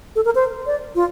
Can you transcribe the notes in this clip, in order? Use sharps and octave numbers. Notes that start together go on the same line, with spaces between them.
A4
A#4
C5
D5
F4